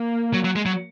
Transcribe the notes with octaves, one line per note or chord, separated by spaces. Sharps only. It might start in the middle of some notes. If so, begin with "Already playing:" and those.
Already playing: A#3
F#3
F#3
G#3
F#3